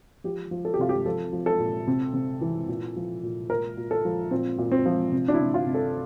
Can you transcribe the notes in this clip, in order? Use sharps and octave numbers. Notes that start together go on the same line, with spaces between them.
F3 G4
F3
A4
G4
C3 F4
G4
F3 A4
F3
A4
A#2
C3
C3
E3
A#2
F3
A#2
A#2 A#4
A#2
A4
F3
A#2 C4
A#2
C4
F3
C3
D4
E4
C3
F4
C3
A4